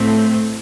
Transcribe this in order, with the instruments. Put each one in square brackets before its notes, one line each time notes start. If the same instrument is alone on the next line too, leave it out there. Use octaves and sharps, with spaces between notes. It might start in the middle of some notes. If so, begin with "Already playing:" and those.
Already playing: [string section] A2 A3 C4